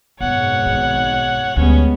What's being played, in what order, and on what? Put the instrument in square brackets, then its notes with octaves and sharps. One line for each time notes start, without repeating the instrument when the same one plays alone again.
[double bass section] G#1 B2 [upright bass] F#2 B3 [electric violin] C#5 F#5
[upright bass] B1 G#2
[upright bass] D2 [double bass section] G3 G#3 B3 [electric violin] C#4 C#5